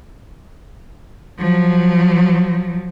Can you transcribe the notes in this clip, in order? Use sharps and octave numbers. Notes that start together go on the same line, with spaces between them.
F3 F#3